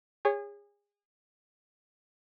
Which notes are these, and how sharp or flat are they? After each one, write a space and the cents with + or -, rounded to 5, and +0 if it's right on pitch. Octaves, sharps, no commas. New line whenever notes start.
G#4 -30 C#5 +0